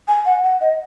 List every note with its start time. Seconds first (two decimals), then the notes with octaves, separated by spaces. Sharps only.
0.08 G#5
0.25 F#5
0.43 F#5
0.61 D#5